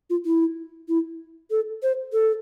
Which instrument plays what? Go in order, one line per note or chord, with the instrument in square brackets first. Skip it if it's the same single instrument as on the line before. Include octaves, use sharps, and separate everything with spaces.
[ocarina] F4
E4
E4
A4
C5
A4